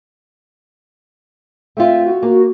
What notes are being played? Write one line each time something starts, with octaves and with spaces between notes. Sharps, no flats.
A3 C4 F4 E5
F#4
A#3